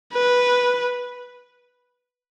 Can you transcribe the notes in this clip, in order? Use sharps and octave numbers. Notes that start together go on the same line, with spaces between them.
B4